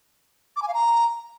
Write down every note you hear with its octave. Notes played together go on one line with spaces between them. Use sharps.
D6
G#5
F5
A#5